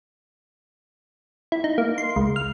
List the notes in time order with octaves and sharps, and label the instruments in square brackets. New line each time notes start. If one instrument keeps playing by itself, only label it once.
[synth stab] E4
D#4
A#3
C6
C#2
F6